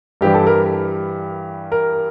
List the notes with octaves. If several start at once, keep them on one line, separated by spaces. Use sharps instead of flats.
G2 E3 G3 G4
A4
A#4
A#4